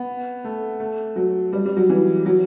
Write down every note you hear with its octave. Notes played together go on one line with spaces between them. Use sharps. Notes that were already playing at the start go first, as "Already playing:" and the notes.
Already playing: B3
A3
A3
F#3
G3
G3
F#3
E3
F#3